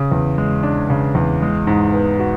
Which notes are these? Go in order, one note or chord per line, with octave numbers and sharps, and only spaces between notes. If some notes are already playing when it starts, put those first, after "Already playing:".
Already playing: C#3
E2
G#3
D4
C#3
E2
G#3
G#2
B3
F#4